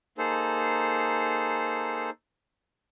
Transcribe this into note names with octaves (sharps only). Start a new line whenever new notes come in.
A#3 D#4 G#4 A4 C5